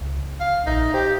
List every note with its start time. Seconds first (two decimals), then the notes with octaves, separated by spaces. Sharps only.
0.01 C#2
0.41 F5
0.66 A#1 D#4 E5
0.94 G4 C5 D#5